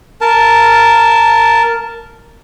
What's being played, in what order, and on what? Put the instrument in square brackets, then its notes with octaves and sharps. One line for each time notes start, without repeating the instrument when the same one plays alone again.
[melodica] A#4 A5